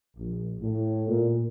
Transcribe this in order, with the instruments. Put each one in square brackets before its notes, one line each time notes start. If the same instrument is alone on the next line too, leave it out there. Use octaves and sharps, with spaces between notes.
[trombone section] A#1
A2
A#2